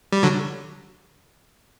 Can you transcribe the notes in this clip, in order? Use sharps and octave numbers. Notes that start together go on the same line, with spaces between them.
G3
D3 F#3